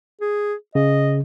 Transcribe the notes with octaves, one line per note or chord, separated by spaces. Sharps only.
G#4
C#3 D#5